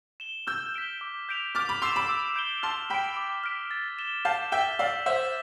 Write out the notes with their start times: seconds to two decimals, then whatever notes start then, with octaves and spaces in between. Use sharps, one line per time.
0.20 E7 G7
0.47 E6 F6 G6
0.74 B6 D7 G7
1.01 D6
1.29 G6 B6 D7 F7
1.55 D6 F6 A6
1.69 B5 D6
1.82 C6 E6 C7 E7
1.96 B5 D6
2.09 E6
2.36 G6 D7 G7
2.63 A5 C6 F6
2.90 G5 B5 B6 D7
3.17 D6
3.44 F6 B6 D7
3.71 A6
3.99 E7 G7
4.25 F5 A5 G6
4.52 E5 G5 B6 E7 G7
4.79 D5 F5 E6
5.06 C5 E5 B6 E7